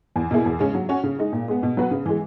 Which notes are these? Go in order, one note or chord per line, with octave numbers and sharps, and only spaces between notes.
E2
B2 A#3 E4 G#4
E2
C#3 G#3 C#4 G#4
F#3
C#4 F#4 C#5
C#3
G#3 D#4
A#2
G#3 B3
B2
F#3 B3 F#4 B4
C#3
E3 G#3